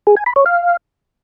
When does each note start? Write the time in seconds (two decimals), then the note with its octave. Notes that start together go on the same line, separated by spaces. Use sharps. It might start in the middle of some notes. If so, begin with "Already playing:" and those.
0.07 G#4
0.17 G#5
0.26 B5
0.36 C#5
0.46 F5